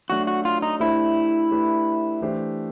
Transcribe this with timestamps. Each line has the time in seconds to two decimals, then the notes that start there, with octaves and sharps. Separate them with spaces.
0.09 F#3 A3 D4 F#4
0.27 F#4
0.45 F4
0.62 D#4
0.80 A3 D4 E4 G4 C5
1.51 A3 D4 G4 B4
2.21 E3 A3 D4 G4 C5